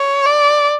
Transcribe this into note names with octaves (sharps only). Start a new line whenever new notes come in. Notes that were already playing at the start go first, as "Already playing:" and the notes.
Already playing: C#5
D5